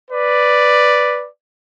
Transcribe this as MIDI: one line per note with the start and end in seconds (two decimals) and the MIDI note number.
0.10 1.27 71
0.10 1.27 74